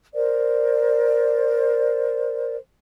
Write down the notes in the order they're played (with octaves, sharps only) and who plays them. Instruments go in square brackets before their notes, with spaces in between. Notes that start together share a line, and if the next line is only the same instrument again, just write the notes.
[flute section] A#4 C5 D5